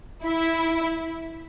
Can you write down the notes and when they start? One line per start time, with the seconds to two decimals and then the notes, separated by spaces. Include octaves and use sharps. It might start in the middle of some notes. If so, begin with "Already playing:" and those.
0.24 E4